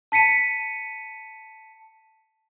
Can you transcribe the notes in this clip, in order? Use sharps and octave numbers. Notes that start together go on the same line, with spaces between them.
A5 B6 C#7 D#7